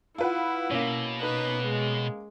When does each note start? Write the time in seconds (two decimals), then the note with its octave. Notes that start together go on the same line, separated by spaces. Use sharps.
0.18 E4 F4 B4 F#5
0.71 B2 A#3 C#4
1.20 D#4 B4
1.64 G#3